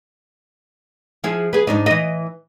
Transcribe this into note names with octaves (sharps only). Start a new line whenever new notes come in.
F3 E4 G#4
B3 G#4
G#2 D4 D#4
E3 D#5